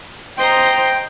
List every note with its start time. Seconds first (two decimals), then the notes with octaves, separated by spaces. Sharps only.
0.37 C5 D#5 G5 A#5 C6